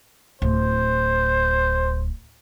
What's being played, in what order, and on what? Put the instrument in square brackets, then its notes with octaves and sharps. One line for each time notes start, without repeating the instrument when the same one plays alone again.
[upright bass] D1 [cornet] C5